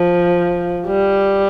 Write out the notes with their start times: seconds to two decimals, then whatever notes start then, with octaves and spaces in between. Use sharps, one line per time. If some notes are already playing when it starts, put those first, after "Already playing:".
Already playing: F3
0.88 G3